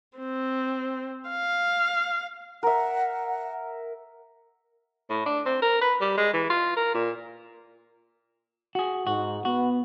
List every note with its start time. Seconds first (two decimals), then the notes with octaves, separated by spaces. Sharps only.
0.18 C4
1.29 F5
2.63 A#4 E5 F#5
5.10 A2
5.26 D4
5.45 C4
5.62 A#4
5.81 B4
6.01 G3
6.17 G#3
6.33 E3
6.49 F4
6.76 A#4
6.94 A#2
8.75 F#4 G#4
9.07 G#2 F#4
9.45 B3 F#4